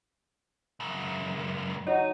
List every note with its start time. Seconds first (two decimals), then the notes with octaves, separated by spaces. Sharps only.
0.80 C#2 F#2
1.87 F#3 D#4